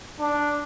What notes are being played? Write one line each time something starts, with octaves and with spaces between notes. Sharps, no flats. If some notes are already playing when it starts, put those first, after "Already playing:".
D4